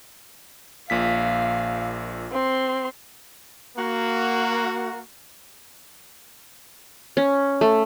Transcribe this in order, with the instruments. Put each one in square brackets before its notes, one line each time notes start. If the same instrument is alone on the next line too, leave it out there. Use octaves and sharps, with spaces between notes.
[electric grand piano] A#1 A#2 B6 [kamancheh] F5
[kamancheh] C4 C6
[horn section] A#3 F#4
[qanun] C#4
A3